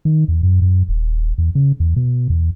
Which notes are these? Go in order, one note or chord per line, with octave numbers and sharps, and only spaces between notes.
D#3
E2
F#2
F#2
D#1
E2
C#3
E2
B2
E2